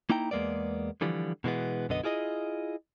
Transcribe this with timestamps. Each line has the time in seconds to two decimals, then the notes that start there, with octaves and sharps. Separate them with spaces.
0.10 A#3 D#4 E4 G5 A#5
0.31 E2 G#3 A#3 B3 D5
1.01 D3 E3 F3 G3
1.44 B2 E3 G#3 B3
1.89 B1 F#2 D3 B3 D#5
2.04 E4 F4 G#4 D5 D#5